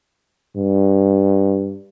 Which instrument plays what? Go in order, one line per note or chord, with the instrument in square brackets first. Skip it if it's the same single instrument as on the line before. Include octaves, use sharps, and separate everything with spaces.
[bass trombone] G2